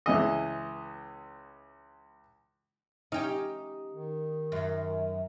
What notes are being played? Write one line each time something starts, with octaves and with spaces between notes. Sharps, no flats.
C#2 E3 D#5
C#4 D#4 G4
D#3
F#2